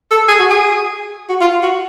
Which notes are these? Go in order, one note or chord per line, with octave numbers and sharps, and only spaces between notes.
A4
G#4
F#4
G#4
F#4
F4
F#4